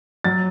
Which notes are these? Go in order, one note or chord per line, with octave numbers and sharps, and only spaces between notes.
F#3 A6